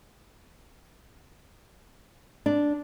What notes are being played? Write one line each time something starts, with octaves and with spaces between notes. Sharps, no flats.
D4